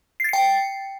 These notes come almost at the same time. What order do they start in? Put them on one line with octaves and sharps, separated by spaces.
C7 A6 C#7 G5